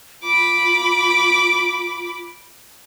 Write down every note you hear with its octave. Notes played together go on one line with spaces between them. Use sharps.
F4 B5 D6